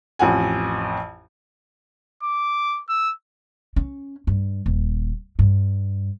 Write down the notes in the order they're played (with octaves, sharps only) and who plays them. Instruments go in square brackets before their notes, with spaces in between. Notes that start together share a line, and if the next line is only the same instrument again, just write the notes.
[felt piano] A1 F2 F#5 G#5
[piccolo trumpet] D6
E6
[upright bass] C#4
G2
D#1
G2